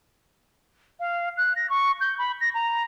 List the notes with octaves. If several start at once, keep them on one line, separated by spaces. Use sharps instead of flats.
F5
F#6
A#6
C#6
G6
B5
A#6
A#5